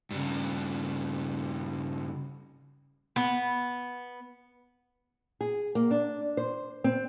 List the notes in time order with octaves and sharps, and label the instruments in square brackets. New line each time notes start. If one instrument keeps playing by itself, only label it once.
[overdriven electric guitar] G2 C#3
[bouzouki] B3
[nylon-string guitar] G#4
A#3
D4
C5
C4